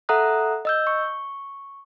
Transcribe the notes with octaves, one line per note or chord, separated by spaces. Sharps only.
A4 E5 F#5 A#5 D#6 F#6
D#5 E6 G6
C#6